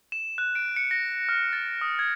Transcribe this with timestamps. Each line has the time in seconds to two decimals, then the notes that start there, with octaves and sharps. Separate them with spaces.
0.12 E7
0.38 F#6
0.55 D7
0.76 C#7
0.91 A#6
1.29 F6
1.53 A6
1.81 D#6
1.99 G#6